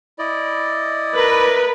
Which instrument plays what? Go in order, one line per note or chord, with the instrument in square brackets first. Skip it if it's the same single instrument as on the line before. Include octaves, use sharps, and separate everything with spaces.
[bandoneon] E4 D5 D#5
[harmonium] A#4 [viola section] B4